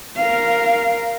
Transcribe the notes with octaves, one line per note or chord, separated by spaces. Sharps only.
A#4 F5